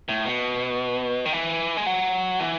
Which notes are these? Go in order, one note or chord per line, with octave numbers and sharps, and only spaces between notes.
A2
B2
D#3
E3
G#3
F#3
E3